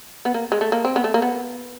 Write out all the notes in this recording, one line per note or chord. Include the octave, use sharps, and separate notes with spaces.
B3
A#3
G#3
A3
A#3
C4
B3
A3
A#3
B3